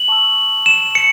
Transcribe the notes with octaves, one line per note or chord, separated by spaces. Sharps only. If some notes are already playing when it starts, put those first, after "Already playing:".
Already playing: F#7
A5 C#6 E6
E7
C#7